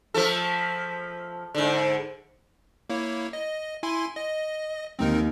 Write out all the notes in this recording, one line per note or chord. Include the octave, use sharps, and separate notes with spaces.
F3 A3 A4
G#2 D3
A#3 E4 C#5
D#5
E4 G#5 C6
D#5
D#2 C4 D#4 A#4